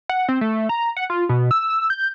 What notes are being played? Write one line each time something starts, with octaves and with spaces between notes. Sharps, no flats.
F#5
C4
A3
A#5
F#5
F4
B2
E6
E6
G6